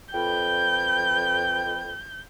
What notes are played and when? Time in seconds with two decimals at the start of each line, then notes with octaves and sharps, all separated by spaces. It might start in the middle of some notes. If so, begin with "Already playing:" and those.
0.14 F2 B4 G5 G6